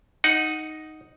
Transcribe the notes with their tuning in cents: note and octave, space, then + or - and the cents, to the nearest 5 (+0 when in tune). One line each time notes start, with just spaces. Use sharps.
D#4 +0 F#5 +0